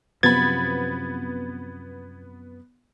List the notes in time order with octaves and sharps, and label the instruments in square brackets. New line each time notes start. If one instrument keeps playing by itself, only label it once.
[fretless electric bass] F#2 C3 F3 [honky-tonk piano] B3 B5 [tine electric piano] G#6 A6